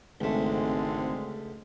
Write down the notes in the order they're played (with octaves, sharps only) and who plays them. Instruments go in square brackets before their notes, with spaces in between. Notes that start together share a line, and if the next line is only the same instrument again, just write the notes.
[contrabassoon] G#1 [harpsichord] C#2 A3 [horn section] D3 G#3 C4